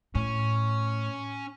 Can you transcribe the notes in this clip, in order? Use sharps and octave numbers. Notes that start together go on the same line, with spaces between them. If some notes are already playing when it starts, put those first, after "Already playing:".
A2 C#4